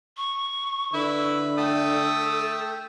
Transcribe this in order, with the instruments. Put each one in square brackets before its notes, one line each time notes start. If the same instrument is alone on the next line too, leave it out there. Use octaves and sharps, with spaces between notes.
[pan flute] C#6
[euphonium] D3 [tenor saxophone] E4 [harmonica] B4
[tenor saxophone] A3 [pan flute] A4 [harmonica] G5 D#6